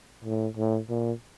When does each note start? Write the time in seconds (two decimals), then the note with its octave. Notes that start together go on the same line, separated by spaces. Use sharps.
0.24 A2
0.57 A2
0.89 A#2